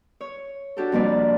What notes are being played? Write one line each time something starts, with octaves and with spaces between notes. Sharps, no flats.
C#5
D4 F#4 G4 A4
F2 C3 G3 A#3 B4 D5